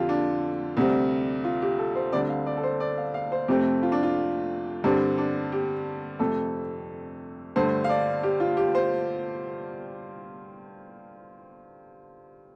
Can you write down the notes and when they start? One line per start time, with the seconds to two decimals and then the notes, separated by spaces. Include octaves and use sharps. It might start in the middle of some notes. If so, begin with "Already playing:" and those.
Already playing: F2 D3 F4 G4 A4
0.09 D4
0.77 D2 C3 G3 C4
1.44 F4
1.62 G4
1.78 A4
1.95 C5
2.12 D2 D3 G3 C4 D5
2.29 F5
2.46 D5
2.57 A4
2.63 C5
2.80 D5
2.97 F5
3.14 F5
3.32 C5
3.48 F2 C3 A3 C4 G4
3.83 F4
3.92 D4
4.03 F4
4.84 G2 D3 G3 C4 D4
5.18 D4
5.52 G4
6.19 F2 C3 A3 C4 A4
7.56 G2 D3 A3 C5
7.84 F5
7.89 D5
8.23 G4
8.40 F4
8.57 G4
8.75 C5